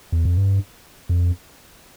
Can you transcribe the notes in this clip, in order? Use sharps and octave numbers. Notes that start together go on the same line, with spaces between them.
E2
F2
G2
F2